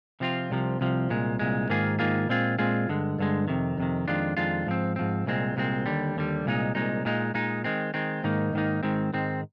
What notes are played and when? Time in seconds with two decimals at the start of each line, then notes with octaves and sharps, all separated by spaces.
0.20 C3 F3 C4 F4
0.50 C2 C3 F3
0.80 C2 C3 F3
1.10 C2 A#2 G#3
1.39 C2 A#2 G#3
1.69 G#2 D#3 A#3 F4 G#4
1.99 G#2 D#3 A#3 F4 G#4
2.29 A#2 G#3 C4 F4 G#4
2.58 A#2 G#3 C4 F4 G#4
2.88 G2 D3 G#3
3.19 G2 D3 G#3
3.48 F2 C3 D#3
3.78 F2 C3 D#3
4.08 F2 D#3 G#3 D4 F4
4.37 F2 D#3 G#3 D4 F4
4.67 G#2 F3 C4
4.96 G#2 F3 C4
5.26 C2 A#2 G#3 C4
5.56 C2 A#2 G#3 C4
5.86 D#2 D3 G3
6.16 D#2 D3 G3
6.45 C2 A#2 G#3 D#4
6.75 C2 A#2 G#3 D#4
7.05 A#2 G#3 D#4
7.34 A#2 G#3 D#4
7.64 D#3 G#3 C4
7.94 D#3 G#3 C4
8.24 G#2 D#3 A#3 D#4
8.53 G#2 D#3 A#3 D#4
8.83 G#2 D#3 G#3 C4
9.13 G#2 D#3 G#3 C4